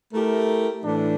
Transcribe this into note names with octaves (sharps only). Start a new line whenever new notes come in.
A3 E4 G4 A#4
A2 E3 A3 D4